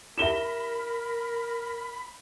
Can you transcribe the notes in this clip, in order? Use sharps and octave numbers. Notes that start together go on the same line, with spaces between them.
E4 G4 A#4 E5 B5 E7 G7